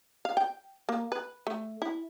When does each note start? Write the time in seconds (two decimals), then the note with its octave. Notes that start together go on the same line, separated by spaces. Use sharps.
0.25 F5
0.37 G5
0.89 A#3
1.12 B4
1.47 A3
1.82 E4